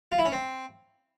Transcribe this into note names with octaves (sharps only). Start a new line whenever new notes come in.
F4
E4
C#4
C4